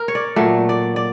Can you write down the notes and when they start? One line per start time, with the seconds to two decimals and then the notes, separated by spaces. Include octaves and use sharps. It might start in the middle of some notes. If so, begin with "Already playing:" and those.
Already playing: A#4
0.08 C#5
0.15 D5
0.36 A#2 F#3 A3
0.69 D5
0.96 D5